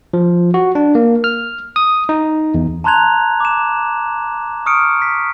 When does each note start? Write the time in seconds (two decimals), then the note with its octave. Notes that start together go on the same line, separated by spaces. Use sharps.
0.14 F3
0.54 F#4
0.75 D4
0.95 A#3
1.24 F6
1.76 D#6
2.09 D#4
2.54 E2
2.84 A5 A#5 C6 F#6 G#6 F7
3.40 D6 E7
4.66 C#6 D#6 F6 C#7 D7
5.02 B6